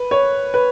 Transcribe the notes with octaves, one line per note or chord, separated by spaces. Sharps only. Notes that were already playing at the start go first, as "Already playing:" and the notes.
Already playing: B4
C#5
B4